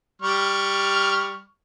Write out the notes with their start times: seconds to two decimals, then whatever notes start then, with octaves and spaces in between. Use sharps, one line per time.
0.22 G3 C#6 F6